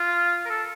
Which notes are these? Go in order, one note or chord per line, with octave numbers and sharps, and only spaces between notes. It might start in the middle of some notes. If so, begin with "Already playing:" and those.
Already playing: F4
A#4
A4